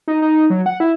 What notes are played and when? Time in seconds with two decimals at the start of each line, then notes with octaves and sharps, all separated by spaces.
0.08 D#4
0.22 D#4
0.50 F#3
0.66 F#5
0.80 E4